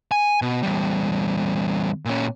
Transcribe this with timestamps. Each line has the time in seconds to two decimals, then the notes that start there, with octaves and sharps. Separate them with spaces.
0.11 G#5
0.42 B2
0.63 E2 G3
2.05 A#2 C#4